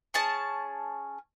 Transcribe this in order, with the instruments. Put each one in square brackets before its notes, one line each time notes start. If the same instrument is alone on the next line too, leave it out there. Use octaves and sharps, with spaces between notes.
[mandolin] C#4 G#4 A5